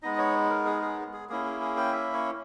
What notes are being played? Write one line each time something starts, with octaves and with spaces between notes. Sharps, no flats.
G#3 B3 D#4 D#5
C#5
A#4
G#4
G#4
G#4
A#3 C#4 E4 G#4
G#4
G#4
G5
E5
C#5